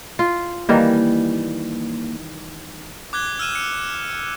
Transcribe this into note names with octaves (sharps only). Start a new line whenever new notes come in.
F4
D#3 E3 G3 A#3
D6 F#6 G#6 G7
E6 F6 D#7 E7
C#7